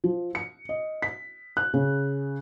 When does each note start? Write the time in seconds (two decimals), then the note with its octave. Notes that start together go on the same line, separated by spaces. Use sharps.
0.04 F3
0.35 C#7
0.69 D#5
1.02 B6
1.57 F#6
1.74 C#3